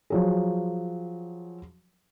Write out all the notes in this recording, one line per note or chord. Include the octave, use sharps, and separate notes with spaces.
F3 F#3 G#4